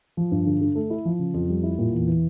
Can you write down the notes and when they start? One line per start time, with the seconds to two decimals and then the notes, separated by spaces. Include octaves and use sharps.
0.17 F3
0.32 G2
0.46 D3
0.61 D3
0.75 A3
0.90 E4
1.05 F3
1.19 C#3
1.34 F2
1.49 G3
1.63 E4
1.79 A#2
1.93 E2
2.08 E3